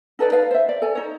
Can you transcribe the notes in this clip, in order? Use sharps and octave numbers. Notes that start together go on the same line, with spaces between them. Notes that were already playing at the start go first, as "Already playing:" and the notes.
D#4 A4 B4 D5
B4 F5
C5 E5
D5
A4 G#5
D#4 C#5